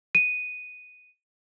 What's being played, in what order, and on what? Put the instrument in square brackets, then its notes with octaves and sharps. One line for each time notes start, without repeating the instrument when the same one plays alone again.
[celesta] D#7